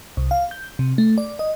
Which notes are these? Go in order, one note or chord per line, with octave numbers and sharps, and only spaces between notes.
C2
F5
G6
C3
A3
D5
D#5